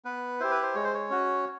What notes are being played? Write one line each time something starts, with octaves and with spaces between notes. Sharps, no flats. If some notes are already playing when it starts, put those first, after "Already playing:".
B3 B4
E4 G4 C5
B4
C5
G#3 C#5
C5
C#5
C#4 F#4